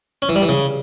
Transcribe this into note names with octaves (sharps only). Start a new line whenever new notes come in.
C#4
E3
G3
E3
C#3